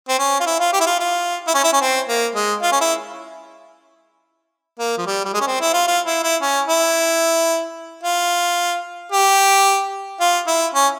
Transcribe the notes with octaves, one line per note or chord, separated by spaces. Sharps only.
C4
C#4
F4
E4
F4
G4
E4
F4
F4
E4
C#4
E4
C#4
C4
A#3
G#3
F4
C#4
E4
A#3
F3
G3
G3
G#3
C#4
C4
E4
F4
F4
E4
E4
C#4
E4
F4
G4
F4
E4
C#4